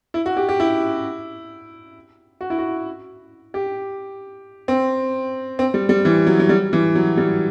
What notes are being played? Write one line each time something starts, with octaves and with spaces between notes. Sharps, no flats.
E4
F#4
G4
G4
E4
F#4
E4
F#4
G4
C4
C4
G3
G3
E3
F#3
F#3
G3
E3
F#3
G3